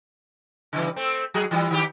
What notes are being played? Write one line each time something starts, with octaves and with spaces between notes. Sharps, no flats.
C#3 E3 G3
A3 C4
F#3 F#4 G#4
E3 G3 E4
D#3 G4